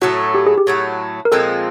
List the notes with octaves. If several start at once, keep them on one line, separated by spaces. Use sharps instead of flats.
A2 F#3 A3 F#4
G4
G#4
G4
A2 F#3 A3
A#4
A#2 F3 G#3 C4 A4